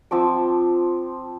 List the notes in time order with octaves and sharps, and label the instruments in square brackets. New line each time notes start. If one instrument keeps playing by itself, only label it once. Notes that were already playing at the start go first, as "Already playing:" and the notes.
[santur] F3 C4 A5 D6